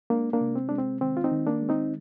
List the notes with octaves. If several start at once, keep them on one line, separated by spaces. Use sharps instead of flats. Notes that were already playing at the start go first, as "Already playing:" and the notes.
G#3 A#3 D4
A#3 D4
C3
C4
G#3 D4
C4
D#3 C4
F4
C4 D#4
D#3
A#3 D4
G#3
C4 D#4